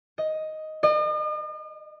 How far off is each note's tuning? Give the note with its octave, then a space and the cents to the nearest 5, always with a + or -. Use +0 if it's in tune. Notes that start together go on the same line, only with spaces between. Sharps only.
D#5 +5
D#5 -45